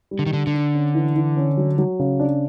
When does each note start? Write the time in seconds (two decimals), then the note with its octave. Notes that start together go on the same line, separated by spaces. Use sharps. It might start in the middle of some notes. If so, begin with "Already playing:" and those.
0.11 G3
0.19 D3
0.26 D#3
0.33 D3 D4
0.47 D3
0.54 D4
0.75 C#4
0.95 E3
1.16 E3
1.37 C#4
1.57 F#3
1.78 F#3
1.99 C#3
2.19 D4